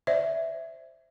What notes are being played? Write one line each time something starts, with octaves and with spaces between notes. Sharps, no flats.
C5 D5 E5